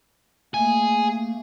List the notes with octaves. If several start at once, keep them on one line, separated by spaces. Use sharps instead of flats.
A3 A#3 G#4